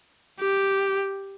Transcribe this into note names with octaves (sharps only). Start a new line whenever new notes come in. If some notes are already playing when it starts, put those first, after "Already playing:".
G4